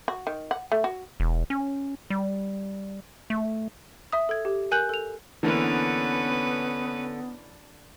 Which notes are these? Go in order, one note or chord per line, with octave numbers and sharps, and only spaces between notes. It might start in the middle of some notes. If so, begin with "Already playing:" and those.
F#4
D#3
F#5
A3
F#4
E1
C#4
G3
A3
E5 D#6
A4 G#6
G4
A#4 G#5 F#6 G6 F#7
A4 F7
D3 E3 A#3 B3 C#4 B4